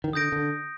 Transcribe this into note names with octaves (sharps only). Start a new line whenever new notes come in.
D#3
D3 D#6 G6 A#6 D7
D3